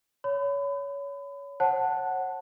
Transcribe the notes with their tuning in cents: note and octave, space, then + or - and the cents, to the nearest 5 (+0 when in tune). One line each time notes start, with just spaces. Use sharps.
C#5 +20 B5 +30
C#5 -45 F#5 +5 A5 +0